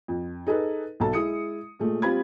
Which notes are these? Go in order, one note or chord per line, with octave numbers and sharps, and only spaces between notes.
F2
D#4 G#4 A4 B4
B1 F#3 A4 A5
G#3 E4 D#6 C#7
A#2 G#3 A3
G3 C4 F4 B5 G#6